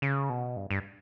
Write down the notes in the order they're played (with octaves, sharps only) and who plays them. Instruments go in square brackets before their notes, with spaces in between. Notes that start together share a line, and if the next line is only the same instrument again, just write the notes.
[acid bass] C#3
B2
G2
G2